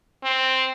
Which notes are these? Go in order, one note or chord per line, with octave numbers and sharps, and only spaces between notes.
C4